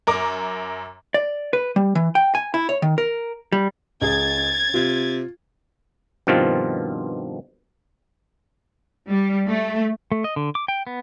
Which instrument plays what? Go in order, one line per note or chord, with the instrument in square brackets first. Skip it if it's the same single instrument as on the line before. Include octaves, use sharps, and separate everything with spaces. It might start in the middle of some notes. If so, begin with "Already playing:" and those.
[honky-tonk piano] F#2 A#4 D6
[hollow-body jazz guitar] D5
B4
G3
E3
G5
G#5
E4
C#5
D#3
A#4
G3
[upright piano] C#2 G#4 [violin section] G#6 A6
[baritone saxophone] C3 [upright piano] F4
[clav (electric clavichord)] G2 B2 D#3 F3 C4 F4
[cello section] G3
A3
[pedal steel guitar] A3
D#5
D3
D6
G5
B3